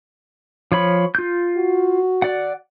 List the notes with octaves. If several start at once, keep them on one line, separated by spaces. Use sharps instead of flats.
F3 C#5 B5
F4 G6
F#4
D5 F#5